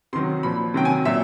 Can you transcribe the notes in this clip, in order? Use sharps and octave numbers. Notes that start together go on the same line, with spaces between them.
C3 D#3 F#3 C6
A#2 F3 B5
C3 D#3 F#3 G5
G#5
A#2 F#3 E5